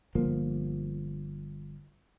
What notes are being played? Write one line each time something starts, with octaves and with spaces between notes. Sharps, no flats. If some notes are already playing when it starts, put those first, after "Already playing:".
G1 F3 A#3